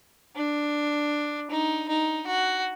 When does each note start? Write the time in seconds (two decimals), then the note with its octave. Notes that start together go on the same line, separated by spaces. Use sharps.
0.36 D4
1.51 D#4
1.88 D#4
2.27 F#4